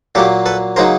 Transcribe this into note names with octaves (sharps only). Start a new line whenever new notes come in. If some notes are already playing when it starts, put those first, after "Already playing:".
A#2 F#3 A#3 G4 A4
A4 B4
C#3 F#3 A#3 D#4 A#4 C5